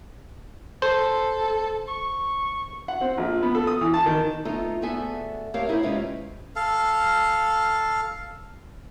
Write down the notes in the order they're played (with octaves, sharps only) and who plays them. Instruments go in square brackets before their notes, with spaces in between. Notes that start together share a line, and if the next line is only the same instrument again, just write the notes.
[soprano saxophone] A4 [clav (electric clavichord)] C5
[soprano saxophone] C#6
[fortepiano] F#5
C4
A#1
B3
A4
D#6
E3
A5
D#3
[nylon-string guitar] A3 B3 D#4 F4 A4
D2 B3 G#4 A4 E5 G#5
A3 C4 G4 A#4 C#5 F5
B3 D#4 E4 G#4 C5 C#5
C3 G#3 C#4 F4 G4 B4
[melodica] A4 F5